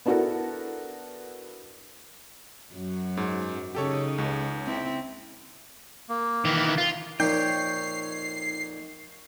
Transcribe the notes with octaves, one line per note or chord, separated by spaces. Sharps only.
B3 D4 E4 F#4 A4 A#4
F#2 F#3
G#2
C#3 D#4 G4 A4 C#5
C#2
C4 E4
A#3
D#3 E3
F4
F2 A#2 D#4 C#5 G5 C7